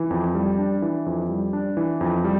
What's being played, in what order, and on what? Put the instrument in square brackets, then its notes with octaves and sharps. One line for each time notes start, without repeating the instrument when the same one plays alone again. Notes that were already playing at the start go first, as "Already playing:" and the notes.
Already playing: [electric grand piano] E3
F2
G3
D4
E3
F2
G3
D4
E3
F2
G3